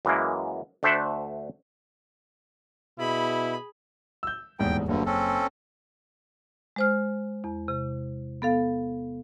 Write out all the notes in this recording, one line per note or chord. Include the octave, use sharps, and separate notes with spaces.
F#2 E3 G#3 A#3
D2 A3 D4 C5 E5 F#5
B2 E4 G#4 B5
E6 G6
D#1 E2 G#2 G5
F#1 D2 G2 D3
C4 C#4 A4
G#3 C5 F6
E2
C3
B3 A4 F5